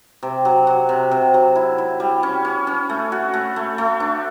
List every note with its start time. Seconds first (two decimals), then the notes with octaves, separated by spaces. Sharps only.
0.23 C3
0.45 F#3
0.67 F#3
0.89 C3
1.11 C3
1.34 F#3
1.56 E4
1.78 E4
2.00 G3
2.23 C#4
2.45 C#4
2.67 C#4
2.90 A3
3.12 F#4
3.34 A3
3.56 A3
3.78 A3
4.00 D4